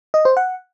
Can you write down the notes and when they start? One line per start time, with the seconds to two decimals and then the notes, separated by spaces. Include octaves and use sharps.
0.14 D#5
0.25 C5
0.37 F#5